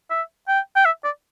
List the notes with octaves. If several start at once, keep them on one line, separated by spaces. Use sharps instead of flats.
E5
G5
G5
E5
D5